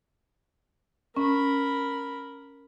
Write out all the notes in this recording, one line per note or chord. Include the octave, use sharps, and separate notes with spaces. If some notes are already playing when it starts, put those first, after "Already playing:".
C#4 A#4 B5